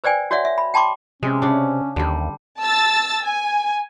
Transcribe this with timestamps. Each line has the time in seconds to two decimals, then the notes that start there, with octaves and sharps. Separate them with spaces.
0.04 B4 C5 D5 G5 G#5
0.31 F#4 C#5 D5 E5 F#5
0.45 E5
0.58 B5
0.74 G5 A5 B5 C6 D6
1.23 C3 G#3 C#4
1.42 C#3 D4
1.96 D#2 D3 G3
2.59 A5 E6 A6
3.23 G#5